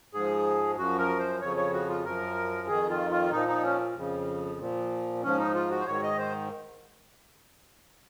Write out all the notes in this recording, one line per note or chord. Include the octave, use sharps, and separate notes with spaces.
G#2 F3 G#4
F#2 F3 F#4
A#4
C5
F2 C#3 F3 C#5
C#5
F#4
F4
F#2 F3 A#4
F2 D#3 G#4
F4
F4
A#2 F3 D#4
D#4
C#4
F2 C#3 F3
A#2 F3
G#2 F3 C#4
D#4
F4
F#4
C5
G#2 D#3 C#5
D#5
C5